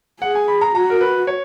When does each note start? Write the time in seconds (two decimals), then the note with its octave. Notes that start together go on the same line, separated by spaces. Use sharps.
0.22 G#4 F#5
0.35 G#5
0.48 B5
0.61 A#5
0.75 F#4 A#5
0.90 A#4
1.01 B4
1.27 C#5